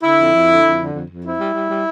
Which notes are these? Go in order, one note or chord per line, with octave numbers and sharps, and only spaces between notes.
D3 E4
F2
F2
D3
F2
D3
F2
F2
C4 E4
G3
G3
G3